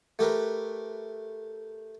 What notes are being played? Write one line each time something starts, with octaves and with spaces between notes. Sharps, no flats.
A3 G4 A#4 B4